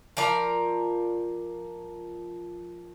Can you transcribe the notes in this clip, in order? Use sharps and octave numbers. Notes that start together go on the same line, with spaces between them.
F3 A#4 D5 A#5